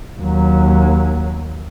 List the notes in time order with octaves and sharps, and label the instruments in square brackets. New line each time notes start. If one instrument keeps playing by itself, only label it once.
[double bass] D#2 F#3